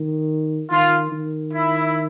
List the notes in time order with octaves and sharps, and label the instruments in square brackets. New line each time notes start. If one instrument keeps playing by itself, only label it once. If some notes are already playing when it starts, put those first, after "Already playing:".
Already playing: [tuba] D#3
[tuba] D#3 [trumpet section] F4
[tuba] D#3
[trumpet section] E4